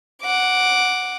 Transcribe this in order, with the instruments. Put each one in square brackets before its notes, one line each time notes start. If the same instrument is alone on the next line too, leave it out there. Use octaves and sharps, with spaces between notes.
[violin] F#5 D6